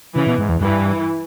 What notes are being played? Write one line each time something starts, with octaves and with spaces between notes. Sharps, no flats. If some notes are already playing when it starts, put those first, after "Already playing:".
C#3 E3
B2
G#2
E2
G2 E3